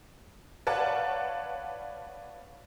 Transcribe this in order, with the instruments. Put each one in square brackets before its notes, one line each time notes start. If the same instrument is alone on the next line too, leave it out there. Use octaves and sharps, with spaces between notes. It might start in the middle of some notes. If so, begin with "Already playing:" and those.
[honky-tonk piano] B4 C#5 D5 F5 F#5 A5